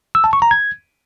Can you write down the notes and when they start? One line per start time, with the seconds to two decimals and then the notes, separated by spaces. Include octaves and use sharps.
0.15 E6
0.24 A5
0.33 C#6
0.42 A#5
0.51 G#6